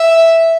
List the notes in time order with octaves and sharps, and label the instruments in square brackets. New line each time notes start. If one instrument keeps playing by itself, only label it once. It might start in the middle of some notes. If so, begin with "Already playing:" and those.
Already playing: [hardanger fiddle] E5